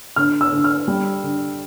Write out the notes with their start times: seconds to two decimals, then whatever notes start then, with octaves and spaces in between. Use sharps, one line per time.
0.16 D3 F6
0.41 E6
0.52 D3
0.64 F6
0.88 G3
1.24 D3